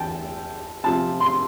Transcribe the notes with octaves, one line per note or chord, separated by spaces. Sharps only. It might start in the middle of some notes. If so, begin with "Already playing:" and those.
Already playing: E2 G5 A5
C3 F3 C4 A5
C6